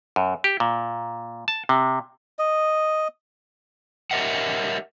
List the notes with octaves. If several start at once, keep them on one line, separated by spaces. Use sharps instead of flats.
F#2
G4
A#2
A5
C3
D#5
G4 A#4 C#5 D#5 E5 F#5